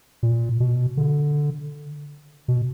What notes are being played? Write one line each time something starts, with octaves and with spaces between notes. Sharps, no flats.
A#2
B2
D3
B2